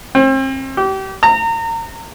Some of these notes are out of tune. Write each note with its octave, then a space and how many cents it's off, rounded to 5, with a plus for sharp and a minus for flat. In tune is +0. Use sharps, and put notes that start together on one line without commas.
C4 +35
G4 -30
A#5 -30